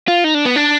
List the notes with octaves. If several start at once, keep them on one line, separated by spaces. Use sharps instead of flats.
F4
D#4
D4
B3
D4